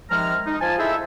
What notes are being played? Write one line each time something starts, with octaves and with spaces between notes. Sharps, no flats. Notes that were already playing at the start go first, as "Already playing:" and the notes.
C3 D#3 F3 G#3 A#5 F6
D#4
F3 G#5 A5
D#4 E4 G#4 A4 C5 E5